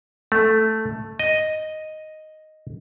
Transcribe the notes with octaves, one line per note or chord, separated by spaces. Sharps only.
A3
D#5